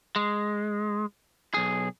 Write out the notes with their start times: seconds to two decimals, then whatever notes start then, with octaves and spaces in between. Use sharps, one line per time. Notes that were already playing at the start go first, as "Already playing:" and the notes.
0.16 G#3
1.54 B1 G#4